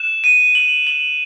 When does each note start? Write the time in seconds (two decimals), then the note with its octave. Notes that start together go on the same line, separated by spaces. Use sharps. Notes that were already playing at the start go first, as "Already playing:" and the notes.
Already playing: F#6 E7
0.24 D#7
0.55 F#7
0.87 F#7